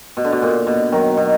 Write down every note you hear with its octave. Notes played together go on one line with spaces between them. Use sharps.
B2
D3
B2
A#2
B2
D#3 F#3
B2